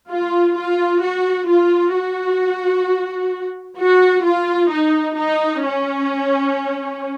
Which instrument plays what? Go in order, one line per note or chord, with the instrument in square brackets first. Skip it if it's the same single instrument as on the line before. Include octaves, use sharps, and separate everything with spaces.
[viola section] F4
F4
F#4
F4
F#4
F#4
F4
D#4
D#4
C#4